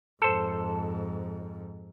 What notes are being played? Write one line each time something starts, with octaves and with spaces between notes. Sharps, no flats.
F2 G#2 A4 C5